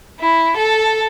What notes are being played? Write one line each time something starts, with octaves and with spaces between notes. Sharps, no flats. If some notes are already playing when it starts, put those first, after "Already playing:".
E4
A4